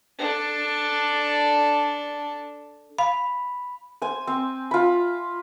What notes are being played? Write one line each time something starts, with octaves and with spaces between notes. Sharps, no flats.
D4 A4
F5 B5
C5 G#5
C4
F4 B5